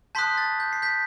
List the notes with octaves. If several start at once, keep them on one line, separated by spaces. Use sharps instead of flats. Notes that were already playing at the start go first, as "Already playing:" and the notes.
A5 C6 D#6 F#6 G6 B6
A6
G6
C7
G6 B6